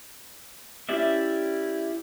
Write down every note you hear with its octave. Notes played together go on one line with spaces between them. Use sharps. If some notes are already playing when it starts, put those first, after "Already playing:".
C#4 E4 G4 D5 E5